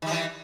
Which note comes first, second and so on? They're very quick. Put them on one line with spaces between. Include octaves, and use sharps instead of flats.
D#3 G3 E3